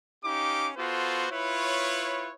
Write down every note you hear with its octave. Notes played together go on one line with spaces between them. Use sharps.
C#4 D#4 G4 F5 D6
B3 F4 F#4 A4 C5
E4 F4 B4 C#5